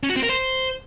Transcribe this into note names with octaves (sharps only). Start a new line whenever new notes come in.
C#4
F#4
C4
A#4
C5